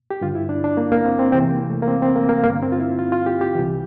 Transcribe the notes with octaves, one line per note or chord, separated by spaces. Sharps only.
G4
G2 D3 F4
E4
D4
D4
A#3
A#3
C4
C4
E2 C3 E3 C4
A#3
A3
A#3
C4
C4
A#3
A#3
G2 D3 A#3
C4
F4
E4
F4
F4
G4
G4
C2 C3 E3